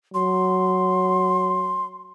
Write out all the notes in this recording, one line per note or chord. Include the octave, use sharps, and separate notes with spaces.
F#3 C6